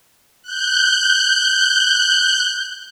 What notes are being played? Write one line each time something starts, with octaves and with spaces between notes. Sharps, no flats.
F#6 G6